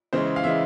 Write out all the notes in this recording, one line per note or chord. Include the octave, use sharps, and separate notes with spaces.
C#3 E3 G#3 C5
F5
C#3 E3 G#3 E5